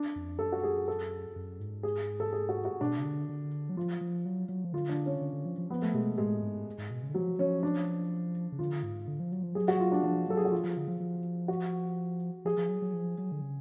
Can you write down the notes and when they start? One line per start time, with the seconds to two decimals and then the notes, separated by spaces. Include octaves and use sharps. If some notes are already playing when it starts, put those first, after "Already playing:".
Already playing: D4
0.16 F2
0.39 F#2 A4
0.52 F#4
0.63 G#4
0.88 A4
1.36 F#2
1.60 G#2
1.83 G#4
2.20 A4
2.33 G#4
2.49 F#4
2.65 F#4
2.81 B2 D4
2.99 C#3
3.04 D3
3.29 D3
3.69 F#3
3.77 F3 F4
4.01 F3
4.25 F#3
4.49 F#3
4.64 F3
4.73 D3 F4
4.89 D4
5.06 C#4
5.21 D3
5.33 D3
5.45 F3
5.58 F3
5.70 F3 B3
5.82 A3
5.94 B2 G#3
6.18 A2 G#3
6.43 G#2
6.78 G#2
6.91 B2
7.03 C#3
7.09 D3
7.14 F3 F#3
7.39 F3 C#4
7.63 D4
8.52 C#3
8.59 D3 F4
8.83 G#2
9.08 D3
9.20 F3
9.32 F#3
9.43 F3
9.55 F#3 G#4
9.68 F#4
9.80 F4
9.92 D4
10.03 F3 D4
10.28 F#3 A4
10.37 G#4
10.45 F#4
10.52 F3 F4
10.64 F3
10.77 D3
10.88 F3
11.00 F3
11.48 F#4
12.45 F3 G#4
12.57 F3
12.69 F#3
12.82 F#3
12.93 F3
13.18 F#3
13.32 D3
13.41 C#3